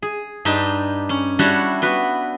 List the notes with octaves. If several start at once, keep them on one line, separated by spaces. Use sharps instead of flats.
G#4
G2 D4 D#4 G4
C#4
G3 D4 E4 F#4 C#5 F#5
B3 F#4 B4